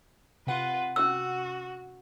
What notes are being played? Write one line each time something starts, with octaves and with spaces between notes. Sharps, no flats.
C3 F4 B4 F#5
C#4 F#4 E6